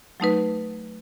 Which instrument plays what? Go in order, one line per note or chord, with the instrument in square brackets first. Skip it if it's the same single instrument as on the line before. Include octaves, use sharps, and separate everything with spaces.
[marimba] F#3 A3 D#4 B4